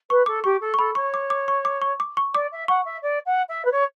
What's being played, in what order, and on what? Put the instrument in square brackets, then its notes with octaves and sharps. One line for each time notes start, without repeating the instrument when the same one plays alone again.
[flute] B4 [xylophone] C#6
[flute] A4 [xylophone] D6
[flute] G4 [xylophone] C#6
[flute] A4
[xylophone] C#6
[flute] A4 [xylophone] B5
[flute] C#5 [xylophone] C#6
[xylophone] D6
D6
C#6
D6
C#6
D6
C#6
[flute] D5 [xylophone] D6
[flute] E5
[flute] F#5 [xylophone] C#6
[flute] E5
D5
F#5
E5
B4
C#5